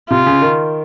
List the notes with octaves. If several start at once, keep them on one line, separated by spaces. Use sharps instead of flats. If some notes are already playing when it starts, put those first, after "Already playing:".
C3 F4
C#3
D#3